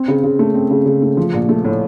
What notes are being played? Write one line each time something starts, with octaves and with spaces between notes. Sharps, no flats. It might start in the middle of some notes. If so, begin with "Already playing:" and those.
Already playing: C4
C#3
C#3
A3
C4
C#3
C#3
A3
F3
A#1
A3
A2